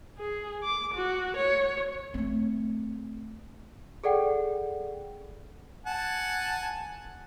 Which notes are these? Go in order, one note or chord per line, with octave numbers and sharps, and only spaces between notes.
G#4
D6
F#4
C#5
A3 C4
G#4 A4 D5 F#5 G5
F#5 G#5 A5